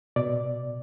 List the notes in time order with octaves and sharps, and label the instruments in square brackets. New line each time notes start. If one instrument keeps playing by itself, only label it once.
[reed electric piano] B2 D5